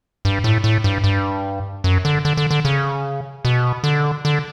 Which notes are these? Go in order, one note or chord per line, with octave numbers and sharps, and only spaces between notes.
G2
A2
A2
G2
G2
F#2
D3
D3
D3
D3
C#3
B2
D3
D3